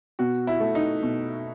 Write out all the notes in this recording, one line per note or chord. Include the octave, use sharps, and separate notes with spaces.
B2 F#4
E4
A3
D#4
B2